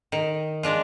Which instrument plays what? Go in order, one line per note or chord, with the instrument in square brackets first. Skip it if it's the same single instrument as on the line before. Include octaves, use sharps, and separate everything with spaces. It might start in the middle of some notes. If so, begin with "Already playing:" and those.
[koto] D#3
G#3 D4 F4